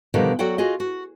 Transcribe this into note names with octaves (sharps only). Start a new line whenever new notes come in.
B2 D3 D#3 F3 G3
F#3 F#4 A4 D5 F#5 G5
F4 F#4 G#4 D#5
F#4